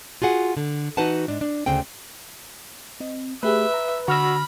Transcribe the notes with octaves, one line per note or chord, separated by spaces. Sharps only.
F4 F#4 G#4 F#5
D3
E3 D#4 F#4 B4 F#5 A5
G#2 D4
D4
D2 C#3 C4 G5
C4 D#5
A3 G4 G#4 B4 E5
A#5
D3 F#4 B5 E6 F6 A#6